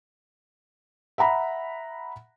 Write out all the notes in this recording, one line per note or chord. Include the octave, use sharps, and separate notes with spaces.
E5 F#5 A#5 B5